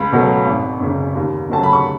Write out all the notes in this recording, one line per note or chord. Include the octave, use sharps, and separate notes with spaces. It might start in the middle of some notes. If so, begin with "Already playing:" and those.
Already playing: C#2 B5
B2 F#3 A3
G#1
F#2 C#3
D#2
C#3 F#3 A3 A5
B5
C#6